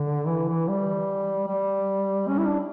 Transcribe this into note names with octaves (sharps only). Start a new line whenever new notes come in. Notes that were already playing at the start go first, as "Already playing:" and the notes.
Already playing: D3
E3
E3
G3
G3
C#4
E4
D4